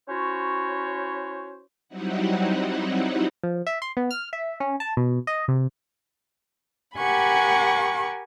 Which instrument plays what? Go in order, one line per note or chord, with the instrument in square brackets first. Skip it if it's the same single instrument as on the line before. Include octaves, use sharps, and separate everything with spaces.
[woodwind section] C#4 E4 F#4 C5 C#5
[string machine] F#3 G3 C4 D#4 E4 F#5
[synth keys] F3
E5
C6
B3
F6
E5
C#4
A5
B2
D#5
C3
[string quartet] G4 A#4 F#5 G#5 B5 C#6